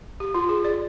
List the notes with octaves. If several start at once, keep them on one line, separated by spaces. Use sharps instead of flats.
G4
F4
G#4
D5